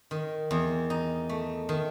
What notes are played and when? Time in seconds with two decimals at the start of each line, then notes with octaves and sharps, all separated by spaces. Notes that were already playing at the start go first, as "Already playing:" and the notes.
0.11 D#3
0.51 E2
0.90 D#4
1.29 A3
1.69 D#3